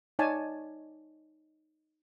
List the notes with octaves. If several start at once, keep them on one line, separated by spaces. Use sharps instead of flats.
D#4 C#5 D5 G#5 A5